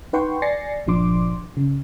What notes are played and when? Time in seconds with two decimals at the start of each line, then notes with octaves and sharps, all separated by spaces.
0.13 D#4 B4 F#5 G5 C6 C#6
0.42 D5 G#5 A6 A#6 C7 C#7
0.86 G1 A#2 F3 D4 C6 D6
1.57 C#3